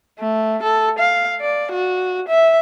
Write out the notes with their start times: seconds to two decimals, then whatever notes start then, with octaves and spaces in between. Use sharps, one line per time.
0.20 A3
0.63 A4
0.99 F5
1.41 D5
1.72 F#4
2.28 E5